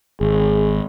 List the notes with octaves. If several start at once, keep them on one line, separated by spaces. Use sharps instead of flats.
G#1 G#4